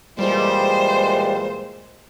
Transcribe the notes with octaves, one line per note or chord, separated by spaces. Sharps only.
A#2 E3 G3 G#3 C5